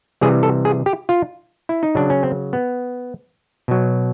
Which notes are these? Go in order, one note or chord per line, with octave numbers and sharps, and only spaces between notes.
C3 E3 G3 G#4
A4
G#4
G4
F4
E4
D#4
C#3 F#3 D4
C#4
C4
B3
B2 F#3